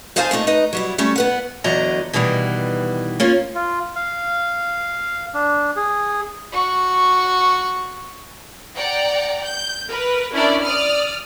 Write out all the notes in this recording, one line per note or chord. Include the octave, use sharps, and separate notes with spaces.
D#4 G#4 C5 F5 G#5 A5
A#2 A3 D#4 A4
D#4 B4 D#5
F#3 G3 E4
G3 A3 C#4
B3 B4 F#5
E2 D3 F#3 D#5 A#5
B2 D#3 E3 G3 B3
A#3 C#4 F4
F4
F5
D4
G#4
F#4 C#6
D5 F#5 G5 A#5
G6
A#4 B4
C#4 D4 E4 A#4 D5
D5 D#6 F6